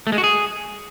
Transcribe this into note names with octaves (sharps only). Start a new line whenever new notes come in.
A3
G#3
F#4
G#4